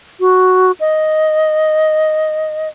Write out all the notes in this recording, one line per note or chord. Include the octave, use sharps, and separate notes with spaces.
F#4
D#5